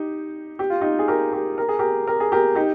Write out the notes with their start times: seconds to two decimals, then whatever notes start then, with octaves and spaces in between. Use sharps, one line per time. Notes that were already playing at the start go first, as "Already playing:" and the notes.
Already playing: D#4 G4
0.59 G4
0.70 F4
0.81 D#4 G4
0.99 G#4
1.08 G4 A#4
1.33 G4 A#4
1.58 A#4
1.69 G#4
1.79 G4 A#4
2.07 A#4
2.20 G#4
2.32 G4 A#4
2.55 D#4 G4